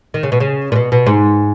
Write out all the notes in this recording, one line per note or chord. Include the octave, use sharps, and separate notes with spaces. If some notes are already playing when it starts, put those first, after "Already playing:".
D#3
C#3
B2
C#3
A#2
B2
B2
G#2